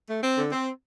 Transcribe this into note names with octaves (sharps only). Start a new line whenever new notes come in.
A3
C4
D3
C4